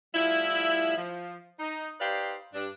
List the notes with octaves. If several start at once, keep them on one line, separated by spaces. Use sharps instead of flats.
A2 F3 G3 E4
F3
D#4
D#4 G4 B4 C5 D5 F5
G2 D4